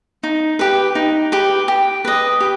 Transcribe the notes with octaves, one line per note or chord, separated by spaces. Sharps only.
D#4
G4 B4
D#4
G4 B4
G4
B4 D#5
G4